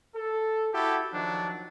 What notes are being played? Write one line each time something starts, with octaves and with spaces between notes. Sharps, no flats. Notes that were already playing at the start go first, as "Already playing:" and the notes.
A4
E4 F#4 G4 A4
D#3 F3 F#3 D4